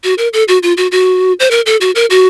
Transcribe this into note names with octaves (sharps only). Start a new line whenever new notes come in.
F#4
A#4
A4
F#4
F4
F#4
F#4
C5
A#4
A4
F#4
A#4
F#4